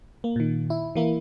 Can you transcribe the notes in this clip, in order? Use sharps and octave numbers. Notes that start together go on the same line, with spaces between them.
A#3
A#2 D#3
E4
E3 A#3 E4